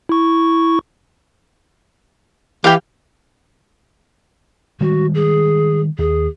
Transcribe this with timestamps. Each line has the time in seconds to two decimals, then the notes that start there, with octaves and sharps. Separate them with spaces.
0.09 E4 C#6
2.64 E3 G4 F5 G5
4.81 D#3 G3 G#3 F#4
5.15 G#4
5.98 D#2 G#4